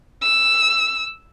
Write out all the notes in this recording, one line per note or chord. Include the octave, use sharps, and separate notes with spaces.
E6